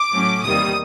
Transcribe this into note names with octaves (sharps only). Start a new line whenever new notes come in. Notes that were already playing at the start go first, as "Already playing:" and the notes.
Already playing: D6
A2 F#3 A3 C#4
E2 C3 D#3 G3 A#3 D#6